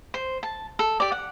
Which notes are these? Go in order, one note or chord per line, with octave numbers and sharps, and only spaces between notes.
C5
A5
A4
G4 D5
F#5